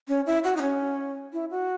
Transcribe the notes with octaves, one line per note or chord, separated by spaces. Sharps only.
C#4
E4
F#4
D#4
C#4
E4
F#4